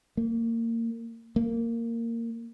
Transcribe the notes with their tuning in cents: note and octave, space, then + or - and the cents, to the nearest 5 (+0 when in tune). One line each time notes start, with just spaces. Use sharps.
A#3 -25
A#3 -15